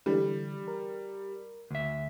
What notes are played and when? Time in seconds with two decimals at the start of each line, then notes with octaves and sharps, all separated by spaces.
0.06 D3 E3 G3
0.68 A#4
1.71 D2 E5